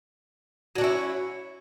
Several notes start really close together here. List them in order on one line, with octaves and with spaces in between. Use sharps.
F#3 D4 C#4 E4